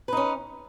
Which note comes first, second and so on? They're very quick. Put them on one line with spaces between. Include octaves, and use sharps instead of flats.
B4 D#4 C#4